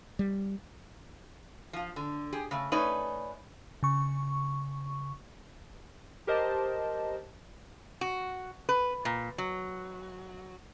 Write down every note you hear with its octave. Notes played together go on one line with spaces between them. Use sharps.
G3
F3 F4
D3
G4 G#4
C#3 A3
A3 C#4 D#4 B4 C#5 D5
C#3 C#6
G4 A#4 C5 D#5 A5
F#4
B4
A#2
F#3